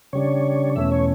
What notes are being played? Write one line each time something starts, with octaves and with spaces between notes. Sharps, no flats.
C#3 G3 D4 C#5
E2 B2 A3 C#4 E5
C#5